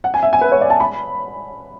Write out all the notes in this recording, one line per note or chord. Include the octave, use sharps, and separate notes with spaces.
F#5
G#5
E5
G#5
B4
C#5
D5
A5
B5